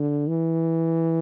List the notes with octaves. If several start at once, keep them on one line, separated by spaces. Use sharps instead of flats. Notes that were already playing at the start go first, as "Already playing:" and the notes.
Already playing: D3
E3